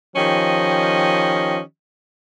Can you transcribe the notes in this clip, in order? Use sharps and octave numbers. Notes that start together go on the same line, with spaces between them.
D#3 F3 C#4 G4 D#5